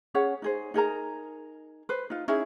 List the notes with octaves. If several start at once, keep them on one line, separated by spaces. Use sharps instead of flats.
C#4 G#4 C#5 F#5
D#4 G#4 C5
D#4 G#4 A#4 A#5
B4 C5
D#4 F4
C#4 D#4 E4 G#4